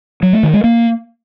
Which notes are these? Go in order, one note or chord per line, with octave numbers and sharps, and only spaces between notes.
F#3
A3
D#3
G#3
A#3